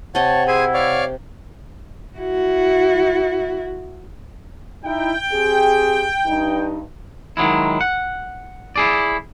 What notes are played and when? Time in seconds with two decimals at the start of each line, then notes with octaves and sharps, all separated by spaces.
0.15 C3 C#5 D#5 F#5 A5
0.48 E4 G#4 C5 G#5
0.74 C#5 D5 F5
2.18 E4 F#4
4.85 D#4 E4 G5
5.32 C4 G4 G#4
6.26 G2 D#4
7.37 D#3 F#3 G#3 E4
7.81 F#5
8.76 E4 G#4 D5